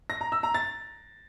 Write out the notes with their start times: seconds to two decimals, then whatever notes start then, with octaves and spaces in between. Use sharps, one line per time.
0.10 A#6
0.21 A#5
0.32 E6
0.43 A#5
0.54 A6